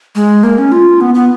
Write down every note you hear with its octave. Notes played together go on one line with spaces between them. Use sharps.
G#3
A#3
C#4
F4
B3
B3